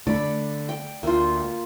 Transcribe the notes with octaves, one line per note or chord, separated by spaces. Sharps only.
D3 A3 D5 B5
G5
D2 A#3 F4